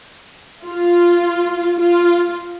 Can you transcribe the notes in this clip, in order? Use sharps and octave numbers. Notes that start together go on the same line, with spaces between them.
F4
F4